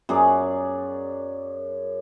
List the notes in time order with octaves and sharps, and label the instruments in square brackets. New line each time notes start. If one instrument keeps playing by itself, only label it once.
[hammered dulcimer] F#2 G#4 D5